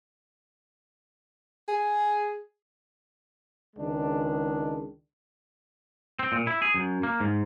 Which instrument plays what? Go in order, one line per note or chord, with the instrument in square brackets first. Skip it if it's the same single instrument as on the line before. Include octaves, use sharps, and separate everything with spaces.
[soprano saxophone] G#4
[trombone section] C#2 D#3 G#3 D4
[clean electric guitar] C4
A#2
E4
G#4
F#2
A#3
G#2